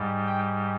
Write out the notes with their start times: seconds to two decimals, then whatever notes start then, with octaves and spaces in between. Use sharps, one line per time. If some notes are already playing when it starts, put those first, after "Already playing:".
Already playing: G#2 G3
0.27 G5